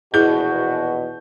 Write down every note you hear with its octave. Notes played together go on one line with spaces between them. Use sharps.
A#1 E2 B2 E4 F#4 G#4 G6